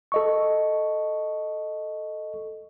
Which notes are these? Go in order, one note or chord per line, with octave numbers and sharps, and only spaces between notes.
A4 D#5 C#6